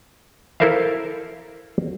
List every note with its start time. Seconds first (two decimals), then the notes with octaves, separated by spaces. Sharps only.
0.60 E4 A4 A#4 C5 E5 F5